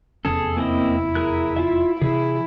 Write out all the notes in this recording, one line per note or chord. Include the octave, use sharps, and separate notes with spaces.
F1 E2 C#4 G#4 A4
A#3 C4 E4 D#5
G#4 A#4 F#6
F4 E5
C3 E3 E4 G#4